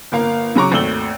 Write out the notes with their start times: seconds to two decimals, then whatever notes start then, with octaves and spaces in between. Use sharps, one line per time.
0.12 G1 A#3 F5
0.55 C#3 F#3 G#4 A#5 C#6 D6
0.72 G#1 D#2 A3 E6 F#7 G7